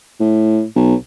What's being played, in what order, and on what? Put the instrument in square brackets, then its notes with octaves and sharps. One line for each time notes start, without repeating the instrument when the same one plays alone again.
[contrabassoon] A2
B1